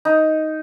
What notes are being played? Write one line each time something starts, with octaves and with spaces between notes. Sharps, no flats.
D#4